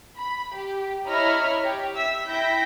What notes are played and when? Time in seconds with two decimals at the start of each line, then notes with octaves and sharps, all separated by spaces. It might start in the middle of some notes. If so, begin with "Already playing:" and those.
0.18 B5
0.55 G4
1.07 E4 C#5 D#5 A#5 B5 F6
1.63 G4 C#5
1.96 E5 E6 B6
2.27 E4 E5 G5 G6 A#6 B6